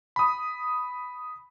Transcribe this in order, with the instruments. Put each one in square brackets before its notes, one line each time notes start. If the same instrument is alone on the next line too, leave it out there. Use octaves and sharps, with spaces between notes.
[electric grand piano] B5 D#6